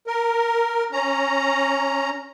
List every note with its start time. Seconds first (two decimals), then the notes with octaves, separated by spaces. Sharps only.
0.07 A#4
0.92 C#4 A#5